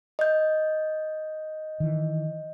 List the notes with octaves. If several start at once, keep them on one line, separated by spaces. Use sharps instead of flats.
D#5 G6
D#3 E3